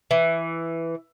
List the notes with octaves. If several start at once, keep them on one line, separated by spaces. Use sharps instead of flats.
E3